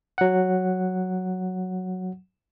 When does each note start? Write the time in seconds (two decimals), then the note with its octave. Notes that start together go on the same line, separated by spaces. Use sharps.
0.18 F#3 F#5